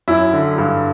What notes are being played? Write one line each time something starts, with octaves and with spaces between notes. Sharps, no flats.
F#2 E4
D3
G2